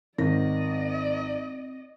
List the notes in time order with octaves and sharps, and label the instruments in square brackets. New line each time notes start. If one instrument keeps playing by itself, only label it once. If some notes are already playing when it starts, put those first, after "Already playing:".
[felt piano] G#1 D#3 A#6 [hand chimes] C4 [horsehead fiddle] D5 D#5